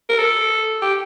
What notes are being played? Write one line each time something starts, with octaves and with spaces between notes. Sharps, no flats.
A#4
A4
G4